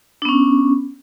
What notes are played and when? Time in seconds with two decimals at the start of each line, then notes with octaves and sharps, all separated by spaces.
0.22 D4
0.25 B3
0.29 C#4